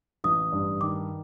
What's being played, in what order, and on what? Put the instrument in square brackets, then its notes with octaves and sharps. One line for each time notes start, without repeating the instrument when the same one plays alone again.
[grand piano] A1 [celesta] D#6
[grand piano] G2
[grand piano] D#3 [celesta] D6